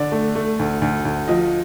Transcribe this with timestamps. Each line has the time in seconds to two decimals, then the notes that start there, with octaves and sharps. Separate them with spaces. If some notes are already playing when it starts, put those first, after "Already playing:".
Already playing: D3 D5
0.12 A3
0.35 A3
0.59 D2
0.82 D2
1.05 D2
1.28 F3 D#5